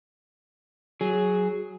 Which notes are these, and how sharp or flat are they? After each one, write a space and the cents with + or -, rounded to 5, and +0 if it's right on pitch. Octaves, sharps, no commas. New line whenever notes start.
F#3 +0 G#4 +5